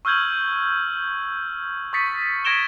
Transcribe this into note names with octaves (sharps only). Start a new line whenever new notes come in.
C#6 E6 F6 G6 G#6 F#7
C#6 D#6 A6 B6 C#7
C#6 G#6 A#6 D7 E7 G7